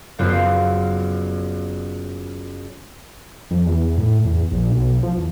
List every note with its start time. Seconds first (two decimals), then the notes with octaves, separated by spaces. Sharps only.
0.19 F#1 F#2 B3 F4 C5
3.51 F2
3.66 E2
3.98 A2
4.25 E2
4.52 A#1
4.70 B1
5.03 F3
5.17 E2